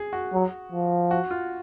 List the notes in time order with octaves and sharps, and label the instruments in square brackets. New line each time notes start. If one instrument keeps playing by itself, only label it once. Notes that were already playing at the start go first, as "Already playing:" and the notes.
Already playing: [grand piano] G#4
F#4
[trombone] F#3
F3
[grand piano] F#4
F4